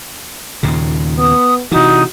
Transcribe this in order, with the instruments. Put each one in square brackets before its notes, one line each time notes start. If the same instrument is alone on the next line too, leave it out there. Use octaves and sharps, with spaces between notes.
[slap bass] D#2 A#2 C#3
[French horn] B3 [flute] D#6
[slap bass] C3 E3 [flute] D#4 [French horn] F#4